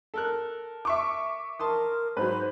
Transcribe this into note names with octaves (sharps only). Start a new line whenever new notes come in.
A4 A#4 F#6
E5 C#6 D6
A#4 A5 C6 D#6
G#2 F#3 B4 C5